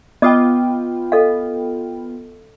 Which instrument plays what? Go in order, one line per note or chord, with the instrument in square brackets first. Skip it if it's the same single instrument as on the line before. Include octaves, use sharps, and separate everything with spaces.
[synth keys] B3 F4 G5 [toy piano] D#5 D6 D#6
[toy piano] A4 D#5 F5